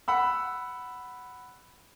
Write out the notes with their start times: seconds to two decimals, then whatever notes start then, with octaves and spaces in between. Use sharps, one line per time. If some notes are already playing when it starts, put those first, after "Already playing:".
0.08 F#5 B5 E6